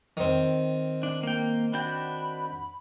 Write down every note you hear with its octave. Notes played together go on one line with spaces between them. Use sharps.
D#3 C4
D4
A#3 G5
D4 F#4 G5 B5